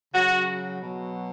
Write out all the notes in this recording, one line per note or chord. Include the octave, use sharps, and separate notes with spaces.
C#3 F#3 F#4
B2 F#3